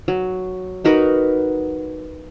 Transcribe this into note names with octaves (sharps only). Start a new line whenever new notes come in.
F#3
D#4 F#4 A#4 B4